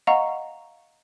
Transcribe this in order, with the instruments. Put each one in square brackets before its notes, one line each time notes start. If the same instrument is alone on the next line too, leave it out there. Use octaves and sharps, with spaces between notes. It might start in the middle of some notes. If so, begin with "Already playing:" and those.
[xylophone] D#5 F5 F#5 A#5 C#6